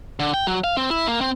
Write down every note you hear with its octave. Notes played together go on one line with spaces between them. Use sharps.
D3
G5
F#3
F5
C4
E4
A#3
C4